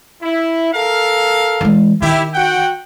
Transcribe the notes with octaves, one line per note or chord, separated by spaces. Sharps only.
E4
A4 A#4 F5
E3 G#3
D#3 E4 G4
F#4 F#5 G5